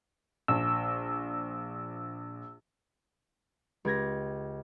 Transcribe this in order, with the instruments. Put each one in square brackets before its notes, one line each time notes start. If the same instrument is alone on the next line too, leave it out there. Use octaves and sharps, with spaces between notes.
[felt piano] A#1 [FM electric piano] E6
[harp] C#2 G4 G#6 A#6